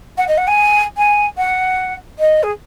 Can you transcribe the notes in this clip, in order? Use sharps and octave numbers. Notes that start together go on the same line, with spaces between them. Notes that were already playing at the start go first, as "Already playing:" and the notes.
F#5
D#5
F#5
G#5
G#5
F#5
D#5
G#4